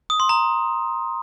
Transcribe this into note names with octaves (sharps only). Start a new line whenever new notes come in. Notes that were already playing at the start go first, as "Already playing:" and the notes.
D#6
C6
A#5